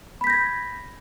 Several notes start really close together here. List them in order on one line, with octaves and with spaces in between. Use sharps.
B5 B6 G6 A#6 G#6